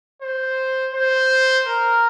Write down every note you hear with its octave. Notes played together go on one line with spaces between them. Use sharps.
C5
C5
A#4